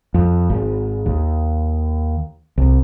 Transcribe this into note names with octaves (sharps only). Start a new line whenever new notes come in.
F2
G#1
D#2
C2